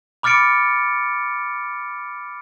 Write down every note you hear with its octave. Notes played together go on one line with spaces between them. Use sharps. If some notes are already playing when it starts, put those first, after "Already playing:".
B5 D6 F6 A6 C#7 D7